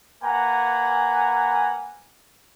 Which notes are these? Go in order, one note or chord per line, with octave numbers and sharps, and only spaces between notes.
A#3 B4 F#5 G#5 A#5